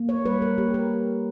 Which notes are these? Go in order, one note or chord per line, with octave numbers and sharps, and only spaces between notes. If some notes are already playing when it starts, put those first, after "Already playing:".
Already playing: A#3
C#5
G3 B4
A#4
A#3 G4
A#4